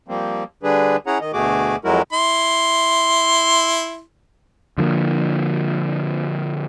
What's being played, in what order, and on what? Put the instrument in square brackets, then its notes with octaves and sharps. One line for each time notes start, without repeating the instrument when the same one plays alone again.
[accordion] F3 G3 A#3 C4
D3 G3 D4 G#4 B4
C#4 E4 G#4 C#5 F#5 A#5
D#3 D#5
D2 B2 A3 F#4 G#4 D6
F2 F#3 G#3 E4 F#4 A#4
[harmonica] E4 C6
[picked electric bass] D3 F3 A3 A#3